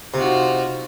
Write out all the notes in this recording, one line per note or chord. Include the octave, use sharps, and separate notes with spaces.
C3 D#4 F4 F#4